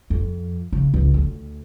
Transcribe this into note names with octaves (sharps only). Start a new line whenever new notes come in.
F2
C#3
C#2
D2